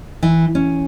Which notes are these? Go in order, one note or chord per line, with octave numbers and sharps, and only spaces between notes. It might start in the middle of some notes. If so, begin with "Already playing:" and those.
E3
C#4